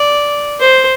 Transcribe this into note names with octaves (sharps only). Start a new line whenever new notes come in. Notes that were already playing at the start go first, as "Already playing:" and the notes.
Already playing: D5
C5